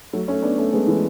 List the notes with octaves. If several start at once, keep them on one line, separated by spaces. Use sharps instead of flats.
F#3 A3
A3 C#4
B3 D4
A3 C#4
G#3 B3
E3 G#3